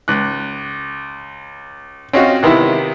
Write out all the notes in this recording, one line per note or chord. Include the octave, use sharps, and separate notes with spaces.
C#2 F#6
C4 C#4 D#4 F4 F#4
C3 D#3 B3 E4